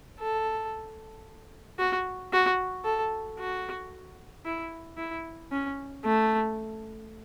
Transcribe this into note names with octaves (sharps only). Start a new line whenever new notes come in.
A4
F#4
F#4
A4
F#4
E4
E4
C#4
A3